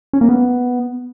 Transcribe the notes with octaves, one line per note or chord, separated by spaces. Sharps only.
C#4
A#3
B3